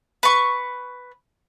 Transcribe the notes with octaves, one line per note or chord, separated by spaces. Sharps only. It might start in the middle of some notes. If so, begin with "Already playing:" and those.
B4 C#6